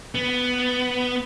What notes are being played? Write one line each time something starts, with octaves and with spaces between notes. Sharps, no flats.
B3